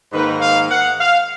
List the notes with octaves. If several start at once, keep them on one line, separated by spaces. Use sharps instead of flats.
G#2 D#3 A#3 D#4 B4
F5
F#5
F5